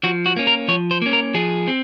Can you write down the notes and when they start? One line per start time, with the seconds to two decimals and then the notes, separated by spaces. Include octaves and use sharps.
0.03 F3 F#4
0.26 F#4
0.36 A#3 C#4
0.47 A#4
0.68 F3 C#5
0.91 C5
1.02 A#3 C#4
1.13 A#4
1.34 F3 G#4
1.68 C4